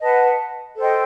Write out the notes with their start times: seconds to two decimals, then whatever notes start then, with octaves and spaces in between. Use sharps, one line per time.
0.01 B4 D#5 F#5 A5
0.77 A4 C5 D#5 G5